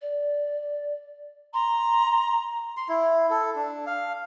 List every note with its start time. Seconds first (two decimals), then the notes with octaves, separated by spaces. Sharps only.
0.02 D5
1.54 A#5 C6
2.77 C6
2.89 E4
3.30 A4
3.56 D4
3.87 F5